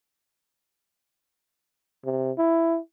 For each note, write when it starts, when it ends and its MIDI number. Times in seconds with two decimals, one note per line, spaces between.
2.05 2.32 48
2.38 2.78 64